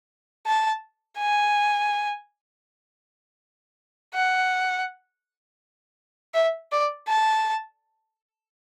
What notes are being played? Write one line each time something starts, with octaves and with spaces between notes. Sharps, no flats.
A5
G#5
F#5
E5
D5
A5